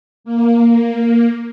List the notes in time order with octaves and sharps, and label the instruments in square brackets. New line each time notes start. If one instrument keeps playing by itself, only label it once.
[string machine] A#3